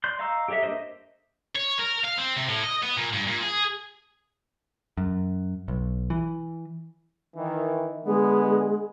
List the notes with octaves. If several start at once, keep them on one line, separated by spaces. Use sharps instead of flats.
D5 C6 G6
D#5 F5 A#5 C#6 E6
G4 A4 C#5 D#5 E5
A#3 D4 G#4 C5 D#5
C#5
A#4
F5
C4
C3
A2
D#5
B3
A#2
G2
A#2
G#4
F#2
B1
E3
D#3 E3
D3 G#3 B3